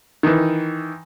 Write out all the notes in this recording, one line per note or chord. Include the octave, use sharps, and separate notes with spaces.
D#3 E3